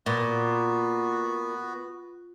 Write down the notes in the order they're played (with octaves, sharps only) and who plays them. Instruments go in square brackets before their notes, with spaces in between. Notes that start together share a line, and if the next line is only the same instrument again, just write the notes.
[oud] A#2 [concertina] B3 F#4